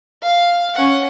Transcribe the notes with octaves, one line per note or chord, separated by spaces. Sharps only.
F5
C#4 F#5